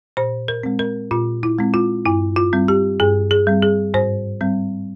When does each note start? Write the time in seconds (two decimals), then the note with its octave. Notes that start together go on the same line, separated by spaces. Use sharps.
0.17 A#2 C5
0.48 A#4
0.63 G#3 C4
0.79 A#4
1.11 A#2 F4
1.43 E4
1.59 G#3 C4
1.74 F4
2.05 G2 E4
2.36 F4
2.53 G3 C4
2.68 G4
3.00 G2 G#4
3.31 G#4
3.47 G3 C4
3.62 G#4
3.94 G#2 C5
4.41 G3 C4